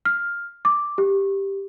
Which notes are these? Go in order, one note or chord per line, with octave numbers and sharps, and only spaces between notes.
F6
D6
G4